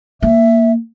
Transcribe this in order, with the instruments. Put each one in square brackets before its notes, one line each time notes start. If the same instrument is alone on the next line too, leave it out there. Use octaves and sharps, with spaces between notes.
[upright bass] A#3 [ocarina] E5